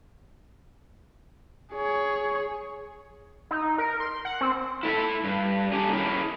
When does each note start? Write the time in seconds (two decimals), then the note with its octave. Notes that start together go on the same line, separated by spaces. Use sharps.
1.73 G#4 C#5
3.51 D#4
3.78 A#4
4.00 C6
4.25 F#5
4.41 C4
4.83 E4 A4 E5
5.24 G2
5.72 D4 G4 G#4
5.92 E4 G#4 A#4 C#5